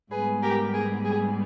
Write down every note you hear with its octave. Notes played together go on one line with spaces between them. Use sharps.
G#2 G3 B3 G#4 B4
G4 A#4
G#4
G#4